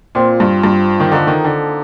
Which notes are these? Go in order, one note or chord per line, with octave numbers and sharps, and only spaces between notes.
A#2 C4 F4 C5
G2
G2
D#3
D3 A#3 D#4 A4
D#3
D3